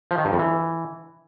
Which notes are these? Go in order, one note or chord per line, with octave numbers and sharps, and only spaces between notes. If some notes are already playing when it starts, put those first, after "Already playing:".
F3
D#3
G2
F2
E3